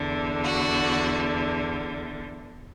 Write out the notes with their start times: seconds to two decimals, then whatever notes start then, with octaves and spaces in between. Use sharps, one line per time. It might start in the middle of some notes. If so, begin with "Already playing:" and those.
Already playing: E2 D3
0.44 F#4